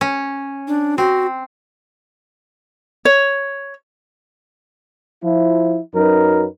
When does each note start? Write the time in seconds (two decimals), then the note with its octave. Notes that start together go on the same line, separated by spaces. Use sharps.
0.01 C#4
0.68 D4
0.98 C4 F#4
3.05 C#5
5.24 F3 E4
5.95 F#2 F#3 D#4 A#4 B4